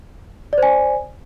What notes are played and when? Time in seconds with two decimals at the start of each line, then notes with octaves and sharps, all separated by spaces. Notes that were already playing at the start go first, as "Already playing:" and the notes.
0.53 D5
0.58 C5
0.63 G#5